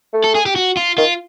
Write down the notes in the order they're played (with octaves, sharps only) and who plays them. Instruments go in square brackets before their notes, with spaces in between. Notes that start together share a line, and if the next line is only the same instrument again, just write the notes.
[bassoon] A3
[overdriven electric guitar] A4
G#4
G4
F#4
F4
[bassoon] D#3 [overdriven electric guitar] F4